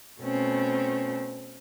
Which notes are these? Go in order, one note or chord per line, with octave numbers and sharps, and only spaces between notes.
B2 A3 C4 C#4